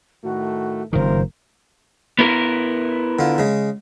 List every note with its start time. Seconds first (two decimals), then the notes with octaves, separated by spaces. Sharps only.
0.23 A2 D#3 A3 F#4
0.93 F#1 C3 D#3 F4 A#4 C5
2.19 B3 E4 A#4
3.19 D3 F4
3.38 C#3 G#3